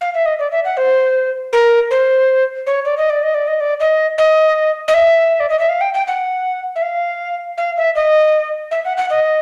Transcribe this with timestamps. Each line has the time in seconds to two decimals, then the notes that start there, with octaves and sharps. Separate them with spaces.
0.01 F5
0.14 E5
0.26 D#5
0.39 D5
0.52 E5
0.65 F#5
0.77 C5
1.53 A#4
1.91 C5
2.67 C#5
2.85 D5
2.98 D#5
3.10 D5
3.23 D#5
3.34 D5
3.47 D#5
3.60 D5
3.80 D#5
4.18 D#5
4.88 D#5
4.94 E5
5.40 D5
5.50 D#5
5.59 E5
5.69 F5
5.81 G5
5.94 G5
6.07 F#5
6.76 E5
6.82 F5
7.58 F5
7.77 E5
7.96 D#5
8.71 E5
8.85 F#5
8.97 F#5
9.10 D#5